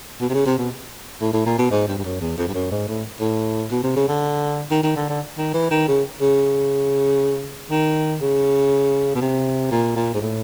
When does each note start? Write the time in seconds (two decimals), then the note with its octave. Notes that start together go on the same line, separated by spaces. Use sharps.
0.21 B2
0.29 C3
0.34 C#3
0.46 C3
0.58 B2
1.22 A2
1.33 A2
1.46 A#2
1.59 B2
1.71 G#2
1.88 G2
1.98 G2
2.04 F#2
2.21 E2
2.38 F2
2.48 G2
2.54 F#2
2.71 G#2
2.88 A2
3.21 A2
3.71 B2
3.84 C3
3.96 C#3
4.09 D3
4.71 D#3
4.83 D#3
4.96 D3
5.09 D3
5.38 D#3
5.54 E3
5.71 D#3
5.88 C#3
6.21 C#3
7.71 D#3
8.21 C#3
9.15 B2
9.21 C3
9.71 A#2
9.96 A#2
10.14 G#2
10.22 A2